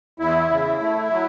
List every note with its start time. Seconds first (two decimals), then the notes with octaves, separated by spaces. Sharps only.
0.19 E2 E4
0.49 C#3
0.80 A3
1.10 F#3